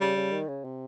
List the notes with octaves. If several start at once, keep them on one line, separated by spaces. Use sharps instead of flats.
C#3 G3
C#3
D#3
C#3
C3